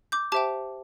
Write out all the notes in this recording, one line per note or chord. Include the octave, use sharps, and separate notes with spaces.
D6 G6
G4 C5 E5 G5 A5 D6